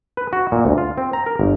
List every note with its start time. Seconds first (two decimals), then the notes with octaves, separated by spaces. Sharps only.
0.17 B4
0.33 F#4
0.52 A#2
0.65 D2
0.78 F4
0.98 C4
1.13 A#5
1.26 A#4
1.39 G1